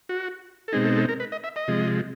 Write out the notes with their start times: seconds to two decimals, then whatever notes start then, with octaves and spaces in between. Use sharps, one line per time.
0.09 F#4
0.68 A4
0.72 B2 G#3 C4 D#4 G#4
0.84 A4
0.96 A4
1.09 A#4
1.20 B4
1.32 D#5
1.44 E5
1.56 D#5
1.68 C3 F3 G#3